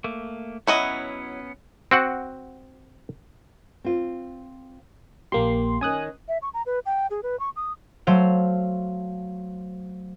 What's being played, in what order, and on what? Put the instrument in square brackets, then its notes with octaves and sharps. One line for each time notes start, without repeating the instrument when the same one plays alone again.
[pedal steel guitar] A3 A#3
[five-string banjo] F#3 E4 D#5 [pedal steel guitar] B3 C#4 F#5
[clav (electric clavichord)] C4 F#4 F#5
[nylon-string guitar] C4 F4
[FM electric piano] A#1 A#3 C6 [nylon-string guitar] G4
[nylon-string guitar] D#3 C#4 [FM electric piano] G#5 D#6 F#6
[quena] E5
C#6
A#5
B4
G5
G#4
B4
C#6
D#6
[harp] F#3 A3 C5 F5